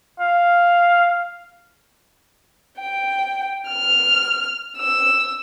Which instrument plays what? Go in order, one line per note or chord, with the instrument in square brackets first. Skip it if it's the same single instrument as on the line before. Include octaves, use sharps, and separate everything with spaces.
[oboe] F5
[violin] G5
F6
E6